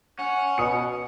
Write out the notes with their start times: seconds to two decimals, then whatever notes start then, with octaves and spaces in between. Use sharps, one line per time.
0.19 C#4 F#5
0.58 B2 D#6 C#7